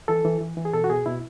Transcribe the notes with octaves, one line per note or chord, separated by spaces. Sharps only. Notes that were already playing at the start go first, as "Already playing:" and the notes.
E3 A4
E3
E3
E3
G#4
B2 A4
F#4
B2 G#4
B2 E4